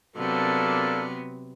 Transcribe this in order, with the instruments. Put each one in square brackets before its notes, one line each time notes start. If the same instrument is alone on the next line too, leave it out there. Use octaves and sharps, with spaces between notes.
[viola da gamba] C3 F#3 B3 [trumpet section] A#3 D4 A4